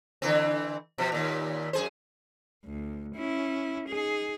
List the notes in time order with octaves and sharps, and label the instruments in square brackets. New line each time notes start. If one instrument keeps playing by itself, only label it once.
[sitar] D3 E3 C4
B2 F3
D#2 A#2
F#2 G#4 C5
[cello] D2
C#4 E4
D#4 G#4